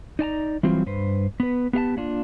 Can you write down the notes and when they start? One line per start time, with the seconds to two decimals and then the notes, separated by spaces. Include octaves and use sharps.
0.19 D#4 D5 A5 A#5
0.63 E3 F#3 G3 C4 F4
0.86 G2 B4 C5
1.40 B3 B4
1.73 B3 G4 F5 A5
1.97 A#3 D4 F4